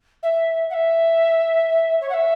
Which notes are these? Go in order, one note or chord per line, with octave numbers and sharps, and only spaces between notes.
E5
F#5
E5
C#5
F#5
E5